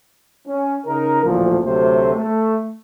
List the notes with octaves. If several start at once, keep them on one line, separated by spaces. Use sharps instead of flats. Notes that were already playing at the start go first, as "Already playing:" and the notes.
C#4
C#3 D#4 A#4
A1 D2 A#2 F3
D2 C3 F#3 A3 C5
A3